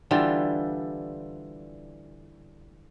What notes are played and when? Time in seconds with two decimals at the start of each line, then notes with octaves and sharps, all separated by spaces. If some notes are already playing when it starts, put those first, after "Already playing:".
0.11 D3 E3 G3 F4